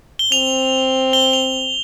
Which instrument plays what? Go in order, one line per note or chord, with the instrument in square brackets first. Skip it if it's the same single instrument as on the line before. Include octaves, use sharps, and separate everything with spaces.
[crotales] G7
[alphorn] C4 [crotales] F7
[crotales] G7
F7